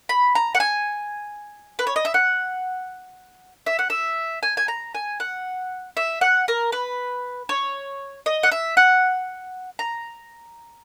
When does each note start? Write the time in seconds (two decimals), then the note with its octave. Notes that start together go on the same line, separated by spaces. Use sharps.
0.09 B5
0.35 A#5
0.55 F#5
0.60 G#5
1.79 B4
1.87 C#5
1.96 D#5
2.05 E5
2.14 F#5
3.66 E5
3.79 F#5
3.90 E5
4.43 G#5
4.57 G#5
4.68 A#5
4.95 G#5
5.20 F#5
5.97 E5
6.21 F#5
6.48 A#4
6.72 B4
7.49 C#5
8.26 D#5
8.43 F#5
8.52 E5
8.77 F#5
9.79 A#5